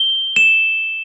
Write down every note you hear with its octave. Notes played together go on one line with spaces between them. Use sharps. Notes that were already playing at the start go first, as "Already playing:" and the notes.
Already playing: G7
E7